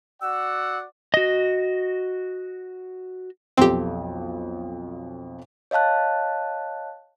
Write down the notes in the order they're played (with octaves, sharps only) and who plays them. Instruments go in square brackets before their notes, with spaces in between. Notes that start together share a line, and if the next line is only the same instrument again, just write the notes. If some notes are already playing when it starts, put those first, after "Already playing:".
[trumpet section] F#4 D5 F#5 [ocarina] E6
[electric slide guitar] F#4 D#5
[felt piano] B1 F2 A4 [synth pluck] C4 G4
[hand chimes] C#5 D#5 F5 A5 F#6